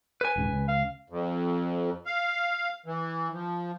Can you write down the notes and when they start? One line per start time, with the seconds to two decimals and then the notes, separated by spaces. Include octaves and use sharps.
0.21 B4 G#5
0.36 D#1 G#2 C#3
0.49 C#2 C#3
0.68 F5
1.10 F2
2.06 F5
2.86 E3
3.32 F3